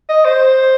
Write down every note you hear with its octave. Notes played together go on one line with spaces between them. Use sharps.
D#5
C5